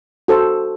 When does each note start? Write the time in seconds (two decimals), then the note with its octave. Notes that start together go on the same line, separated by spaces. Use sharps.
0.28 F#4 A4 C5